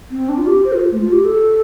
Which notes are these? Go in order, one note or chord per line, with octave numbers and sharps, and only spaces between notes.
C4
D4
F4
G4
C5
F4
A3
F4
G4
A4